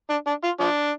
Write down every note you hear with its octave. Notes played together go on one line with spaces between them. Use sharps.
D4
D4
F4
F3 D4